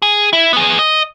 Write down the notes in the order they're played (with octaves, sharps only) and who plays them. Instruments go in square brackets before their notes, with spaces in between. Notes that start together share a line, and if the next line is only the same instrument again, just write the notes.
[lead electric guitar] G#4
E4
B3 G#4
D#5